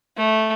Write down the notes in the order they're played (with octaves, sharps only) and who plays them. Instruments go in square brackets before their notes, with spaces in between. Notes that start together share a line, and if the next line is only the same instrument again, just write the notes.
[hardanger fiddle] A3